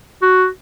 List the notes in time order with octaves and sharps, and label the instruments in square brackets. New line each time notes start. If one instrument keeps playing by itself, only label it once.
[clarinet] F#4